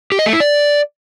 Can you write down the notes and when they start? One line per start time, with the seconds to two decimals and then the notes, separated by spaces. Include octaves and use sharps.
0.12 G4
0.19 D#5
0.26 A3
0.33 E4
0.40 D5